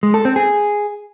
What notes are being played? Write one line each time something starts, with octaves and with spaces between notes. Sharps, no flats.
G#3
A4
C4
G#4